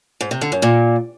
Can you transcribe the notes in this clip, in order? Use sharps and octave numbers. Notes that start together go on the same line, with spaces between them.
G#2
C3
D3
F#2
A#2